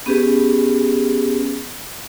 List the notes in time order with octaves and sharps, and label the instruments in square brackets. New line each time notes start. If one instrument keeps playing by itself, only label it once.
[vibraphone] B3 C#4 G4 G#4 B4